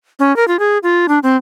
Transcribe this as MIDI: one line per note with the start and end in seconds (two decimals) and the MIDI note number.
0.19 0.35 61
0.36 0.47 70
0.48 0.59 65
0.59 0.78 68
0.83 1.06 65
1.08 1.19 62
1.23 1.37 60